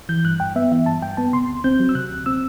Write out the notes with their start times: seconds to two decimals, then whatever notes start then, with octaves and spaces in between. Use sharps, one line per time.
0.09 E3 G6
0.25 G2 F#6
0.40 G2 G5
0.56 B3 E5
0.71 E3 E5
0.86 G2 A5
1.02 G2 G5
1.17 B3 A5
1.33 C3 C6
1.48 D2
1.64 C4 G6
1.80 F#3
1.89 E6
1.95 C3 F#6
2.10 D2
2.26 C4 E6